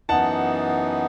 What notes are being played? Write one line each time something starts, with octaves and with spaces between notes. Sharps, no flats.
F#2 E3 B3 D#4 F#5 A5